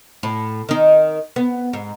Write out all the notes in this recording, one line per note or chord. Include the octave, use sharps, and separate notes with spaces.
A2
D#3 D#4
B3
G#2